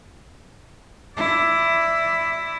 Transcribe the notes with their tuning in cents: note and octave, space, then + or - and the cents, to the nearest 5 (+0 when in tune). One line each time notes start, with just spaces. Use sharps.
E4 +10 D5 +0